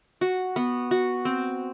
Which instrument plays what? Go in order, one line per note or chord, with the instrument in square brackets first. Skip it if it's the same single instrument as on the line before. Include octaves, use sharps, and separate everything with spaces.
[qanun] F#4
B3
F#4
C4